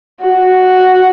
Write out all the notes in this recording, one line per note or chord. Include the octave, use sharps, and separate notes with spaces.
F#4